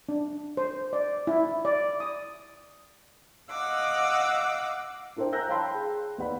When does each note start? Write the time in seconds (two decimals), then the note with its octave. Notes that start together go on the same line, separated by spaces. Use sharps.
0.09 D4
0.57 C5
0.93 D5
1.27 E4
1.65 D5
2.00 D#6
3.50 D#5 F5 F#5 D6 E6
5.16 D4 E4 A#4 C5 G5
5.33 G#5 A#5 E6 F#6 G6 A#6
5.48 C#5 F5 G5 A5 B5 C6
5.75 G#4
6.18 D#2 B3 D5 F#5 B5